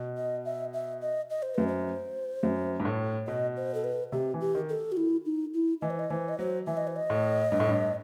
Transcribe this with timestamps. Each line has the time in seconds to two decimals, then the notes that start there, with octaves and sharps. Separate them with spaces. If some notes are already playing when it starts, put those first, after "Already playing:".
Already playing: B2
0.17 D#5
0.45 E5
0.74 E5
1.02 D#5
1.30 D#5
1.43 C5
1.55 F#2 B4
1.68 C5
2.43 F#2
2.80 G2
2.85 A2
3.27 B2 D#5
3.57 C5
3.74 A4
3.84 B4
4.12 C3 G4
4.34 E3
4.41 G4
4.55 D#3
4.69 A4
4.92 F#4
4.97 E4
5.26 D#4
5.54 E4
5.82 E3 D#5
5.90 C5
5.99 D#5
6.10 E3 C5
6.29 D#5
6.39 F#3 C5
6.67 E3 E5
6.77 D#5
6.87 C5
6.96 D#5
7.10 A2
7.52 G2
7.60 A2
7.69 G2